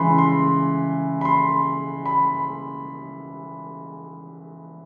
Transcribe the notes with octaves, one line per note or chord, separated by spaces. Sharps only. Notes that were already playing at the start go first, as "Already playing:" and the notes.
Already playing: C#3 E3 G#3 B5 C6
C6
B5
C6
B5